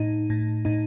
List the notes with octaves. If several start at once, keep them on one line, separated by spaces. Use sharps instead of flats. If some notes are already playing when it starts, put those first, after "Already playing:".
Already playing: A2 D#4
A2
A2 D#4